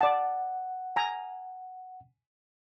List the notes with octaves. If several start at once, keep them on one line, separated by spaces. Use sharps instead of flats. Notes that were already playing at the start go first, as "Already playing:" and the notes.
D5 F#5 A5
G#5 A#5